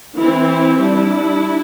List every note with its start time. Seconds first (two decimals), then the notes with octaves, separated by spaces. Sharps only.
0.18 E3 C4 E4
0.81 G3 D4 E4